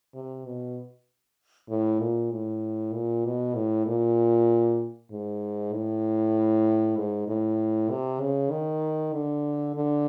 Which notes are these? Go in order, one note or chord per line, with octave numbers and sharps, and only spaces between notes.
C3
B2
A2
A#2
A2
A#2
B2
A2
A#2
G#2
A2
G#2
A2
C3
C#3
D#3
D3
D3